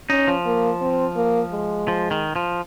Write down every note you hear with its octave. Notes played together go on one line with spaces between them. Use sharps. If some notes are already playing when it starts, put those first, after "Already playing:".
C#4 D#4
F3
A#3
C4
A#3
G#3
F3
D#3
F3